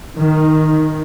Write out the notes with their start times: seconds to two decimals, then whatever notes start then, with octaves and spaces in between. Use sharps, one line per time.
0.18 D#3